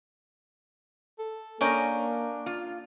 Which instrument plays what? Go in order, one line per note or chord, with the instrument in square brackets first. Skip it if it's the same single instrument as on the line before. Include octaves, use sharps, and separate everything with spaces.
[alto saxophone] A4
[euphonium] A#3 [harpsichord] C#4 G5 [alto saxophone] D4 [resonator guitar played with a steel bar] A#4 D#5
[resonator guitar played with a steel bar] F4